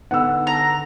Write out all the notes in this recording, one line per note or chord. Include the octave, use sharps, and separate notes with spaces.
D3 B3 D#4 F#5 E6
A#5